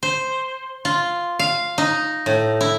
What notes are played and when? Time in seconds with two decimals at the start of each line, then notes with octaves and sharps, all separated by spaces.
0.03 C5
0.85 F4
1.39 F5
1.78 D#4
2.26 A2
2.61 E4